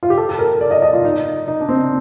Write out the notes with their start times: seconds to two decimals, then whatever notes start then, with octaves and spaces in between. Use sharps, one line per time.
0.03 F4
0.10 G4
0.18 A4
0.29 A4
0.39 A#4
0.61 D5
0.71 D#5
0.82 D#5
0.93 F4
1.05 D#4
1.48 D#4
1.61 D4
1.69 C4